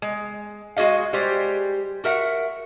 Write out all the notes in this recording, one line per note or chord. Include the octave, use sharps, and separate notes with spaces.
G#3
G#3 F#4 G#4 D#5 F5
G3 G#3 G4 C5
F#4 A#4 E5 F#5